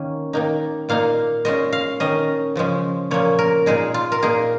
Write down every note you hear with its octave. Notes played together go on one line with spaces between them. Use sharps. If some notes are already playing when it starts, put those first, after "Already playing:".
Already playing: D#3 A#3 C#4
D#3 A#3 D#4
A#2 A#3 D#4 F5
A#2 G#3 C#4 D#5
F5
D#3 C#4 D#5
C#3 F3 G#3 C#4
A#2 F3 A#3 C#4 C#5
A#4
A#2 G#3 D#4 G#4
F4
A#4
A#2 A#3 D#4 G#4